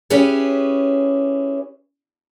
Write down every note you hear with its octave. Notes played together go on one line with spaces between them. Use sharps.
C#4 E4 G4 G#4 B4 C#5